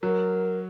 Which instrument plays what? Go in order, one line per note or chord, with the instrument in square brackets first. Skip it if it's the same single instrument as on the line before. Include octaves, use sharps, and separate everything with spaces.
[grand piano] F#3 [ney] A#4